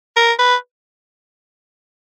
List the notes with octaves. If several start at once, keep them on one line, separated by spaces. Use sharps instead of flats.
A#4
B4